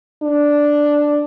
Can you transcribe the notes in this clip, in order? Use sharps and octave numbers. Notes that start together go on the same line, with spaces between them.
D4